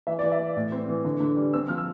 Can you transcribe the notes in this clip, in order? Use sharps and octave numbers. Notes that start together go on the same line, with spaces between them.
E3 E5
D5
E3
E5
E3
A2
C4
E3
D3
D3
G3
C4 E6
F3 F6
E6